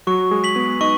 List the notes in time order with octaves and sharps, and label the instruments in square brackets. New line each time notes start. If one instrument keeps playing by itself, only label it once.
[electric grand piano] F#3 F#4 [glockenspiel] C#6
[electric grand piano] G#3 G#4
[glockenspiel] B6 F#7
[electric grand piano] B3 B4
[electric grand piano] D#4 D#5 [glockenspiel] C#6